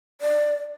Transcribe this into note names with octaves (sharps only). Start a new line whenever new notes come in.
D5